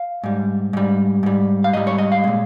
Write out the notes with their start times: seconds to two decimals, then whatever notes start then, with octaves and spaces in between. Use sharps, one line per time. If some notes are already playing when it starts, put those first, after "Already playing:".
Already playing: F5
0.24 G#2 G3
0.73 G#2 G3
1.23 G#2 G3
1.64 F5
1.73 G#2 G3 D#5
1.87 C#5
1.98 D#5
2.12 F5
2.24 A#2 G#3